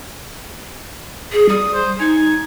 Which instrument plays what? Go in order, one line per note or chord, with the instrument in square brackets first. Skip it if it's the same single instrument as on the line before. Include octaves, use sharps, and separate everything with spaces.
[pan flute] G#4
[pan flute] G3 [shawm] D#6
[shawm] C5
[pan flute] D#4 [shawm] G#5